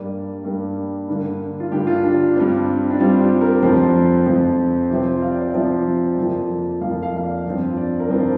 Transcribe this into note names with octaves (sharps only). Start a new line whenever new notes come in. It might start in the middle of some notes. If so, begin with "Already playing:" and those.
Already playing: G2 G3 A#3 D5
G2 G3 A#3
G2 D3 A#3
F4
G2 D3 A#3 G4
F4
D4
G2 G3 C4
D4
G2 G3 C4 F4
G4
A#4
F2 F3 C4 C5
F2 F3 C4
C3 F3 C4
F5
D5
C5
C3 F3 C4 D5
F2 F3 A#3
F2 F3 A#3 F5
F5
F5
D5
G2 F3 C4
D5
A#4
G2 F3 C4 C5